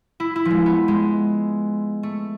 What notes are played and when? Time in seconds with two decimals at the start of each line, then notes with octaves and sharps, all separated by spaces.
0.20 E4
0.36 E4
0.45 F3
0.51 G#3
0.66 B3
0.88 G#3
2.03 A3